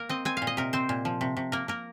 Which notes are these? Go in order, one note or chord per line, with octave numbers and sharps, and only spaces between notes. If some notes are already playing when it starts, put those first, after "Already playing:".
Already playing: A#3 A#4
C4 D#5
C4 G#5
F5
A#2
D#5
C3 A#4
C4 C5
A#2
F3
C3
C3
A#3 A#4
A#3 A#4